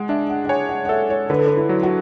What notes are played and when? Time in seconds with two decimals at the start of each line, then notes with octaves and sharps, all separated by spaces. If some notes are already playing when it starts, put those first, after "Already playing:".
Already playing: G#3 F#5
0.09 D4 E5
0.29 F#5
0.45 F#5
0.49 C#5 G#5
0.69 F#5
0.85 F#5
0.89 A4 E5
1.10 C#5
1.30 D3 B4
1.39 A4
1.47 B4
1.57 E4
1.69 F#3
1.83 F#4